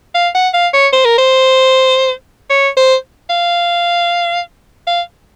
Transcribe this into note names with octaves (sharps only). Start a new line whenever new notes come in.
F5
F#5
F5
C#5
C5
A#4
C5
C#5
C5
F5
F5